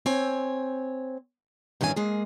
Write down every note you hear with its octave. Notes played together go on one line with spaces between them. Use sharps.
C4 C#5 G#5
G2 D#3 E3 C#4 G#5
G#3 A#3 G#4